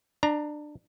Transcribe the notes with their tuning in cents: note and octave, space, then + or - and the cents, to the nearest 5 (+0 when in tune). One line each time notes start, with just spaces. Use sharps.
D4 +20 A#5 +0